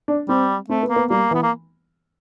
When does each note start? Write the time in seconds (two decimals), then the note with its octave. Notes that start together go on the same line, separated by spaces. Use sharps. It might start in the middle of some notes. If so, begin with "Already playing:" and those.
0.08 D4
0.28 G3 C4
0.69 A3 C4
0.83 B3
0.89 A#3
0.96 B3
1.10 G3 A#3
1.31 E3
1.34 B3
1.42 A#3